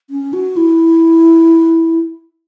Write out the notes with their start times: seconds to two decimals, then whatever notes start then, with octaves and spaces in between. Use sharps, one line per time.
0.10 C#4
0.33 F#4
0.57 E4